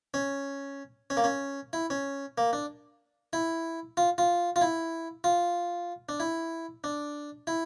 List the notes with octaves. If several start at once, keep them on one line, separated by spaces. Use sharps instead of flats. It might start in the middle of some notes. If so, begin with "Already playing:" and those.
C#4
C#4
A#3
C#4
E4
C#4
A#3
D4
E4
F4
F4
F4
E4
F4
D4
E4
D4
E4